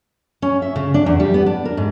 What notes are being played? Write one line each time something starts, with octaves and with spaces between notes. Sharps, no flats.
C#4
E5
C#3
D4
E2
G3
B3
D4
A#4
G#2